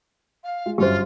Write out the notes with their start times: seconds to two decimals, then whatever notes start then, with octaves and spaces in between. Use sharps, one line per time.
0.43 F5
0.66 G#3 F4
0.78 G1 F#2 F4 G4 C5